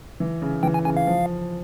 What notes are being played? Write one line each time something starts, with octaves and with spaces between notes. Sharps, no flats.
E3
C#3
E3 G5
G#5
C#3 G#5
F5
F3